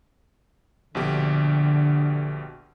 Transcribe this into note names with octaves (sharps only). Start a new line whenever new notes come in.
A#1 B2 D3 G4